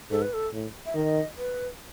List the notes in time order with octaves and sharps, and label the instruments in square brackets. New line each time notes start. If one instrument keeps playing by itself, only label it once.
[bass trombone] G#2 [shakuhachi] A4
[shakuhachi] B4
A4
[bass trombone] A2
[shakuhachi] E5
[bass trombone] D#3 [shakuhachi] D#5
[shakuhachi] B4